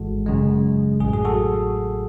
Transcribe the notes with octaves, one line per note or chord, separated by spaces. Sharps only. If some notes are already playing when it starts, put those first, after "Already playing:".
Already playing: G#1 G#2 E3 G#3 F#4 A4
F#2 C#3 G#3
A1 A2 F#3 G#4
G#4
F#4 A4